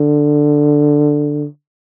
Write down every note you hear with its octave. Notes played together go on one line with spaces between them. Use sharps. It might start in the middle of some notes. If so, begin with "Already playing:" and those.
Already playing: D3